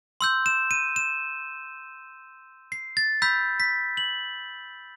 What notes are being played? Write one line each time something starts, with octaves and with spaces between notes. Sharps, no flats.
C6 E6 G6
E7
D#7
E7
C7
A6
B5 E6 G6 B6
B6
F#7